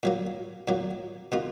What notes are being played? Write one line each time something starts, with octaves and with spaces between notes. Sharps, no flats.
A#2 F#3 A#3
A#2 F#3 A#3
B2 A#3 F4